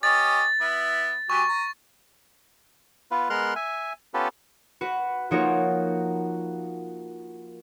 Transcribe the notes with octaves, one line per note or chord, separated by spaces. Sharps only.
C#4 G4 D#5 A6
B3 E4
F#3 G4 G#5 C#6
A#5
B3 F4 B4
G#3 B3 A#4 C6 F6 F#6
E5 G#5
B3 C#4 F4 G4 A4 B4
F#4 B4
F3 A#3 D#4 F#4 A#4 C#5